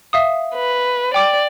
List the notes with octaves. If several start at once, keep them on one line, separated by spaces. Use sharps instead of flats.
E5 F5 D#6
B4
D5 G5 D6